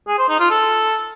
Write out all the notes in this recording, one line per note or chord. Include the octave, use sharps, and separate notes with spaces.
G#4
C5
D#4
F4
A4